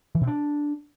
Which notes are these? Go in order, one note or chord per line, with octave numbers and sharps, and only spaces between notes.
E3
B2
D4